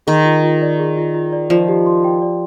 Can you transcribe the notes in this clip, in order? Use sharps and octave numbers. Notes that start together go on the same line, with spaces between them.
D#3 G#4
F4
F4
D5
G#4
F4
F4
D5
F3 D5
G4
C6
G5
D5